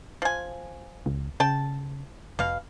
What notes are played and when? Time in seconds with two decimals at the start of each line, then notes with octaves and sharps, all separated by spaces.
0.22 F3 G#5
1.06 C#2
1.40 C#3 G5 A5
2.39 F1 B2 F5